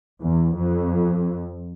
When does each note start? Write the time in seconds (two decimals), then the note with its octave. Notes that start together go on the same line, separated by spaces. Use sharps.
0.21 E2
0.57 F2